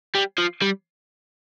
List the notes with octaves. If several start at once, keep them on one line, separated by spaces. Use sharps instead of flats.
G3
F3
G3